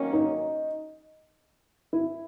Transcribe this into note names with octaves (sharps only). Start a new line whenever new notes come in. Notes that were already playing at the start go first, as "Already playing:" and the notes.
Already playing: D#3 F#3 A#3 C#4
D#4
E4